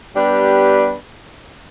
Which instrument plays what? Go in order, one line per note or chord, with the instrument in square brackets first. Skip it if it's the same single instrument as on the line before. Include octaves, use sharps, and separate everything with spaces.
[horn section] G3 B3 D4 G4 B4